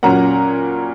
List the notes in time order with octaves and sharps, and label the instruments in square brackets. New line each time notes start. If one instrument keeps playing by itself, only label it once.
[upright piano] A#2 F#3 C#4 F#5 A#5